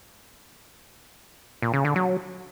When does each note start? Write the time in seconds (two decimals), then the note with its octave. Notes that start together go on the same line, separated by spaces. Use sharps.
1.62 A#2
1.74 C#3
1.85 D3
1.96 F#3